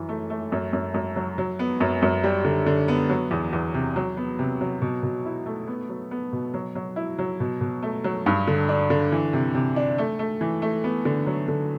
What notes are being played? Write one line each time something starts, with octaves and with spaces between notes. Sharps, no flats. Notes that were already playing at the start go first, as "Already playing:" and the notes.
Already playing: F#2 E3
A3
A3
F#2
F#2
F#2
F#3
F#3
B3
F#2
F#2
G3
D3
D3
B3
F#3
E2
E2
C3
F#3
B3
C3
F#3
B2
B2
E4
A3
B3
F#3
B3
B2
F#3
F#3
E4
F#3
B2
B2
A3
F#3
G2
D3
D4
D3
E3
C3
C3
D4
A3
A3
E3
A3
B3
D3
F#3
D3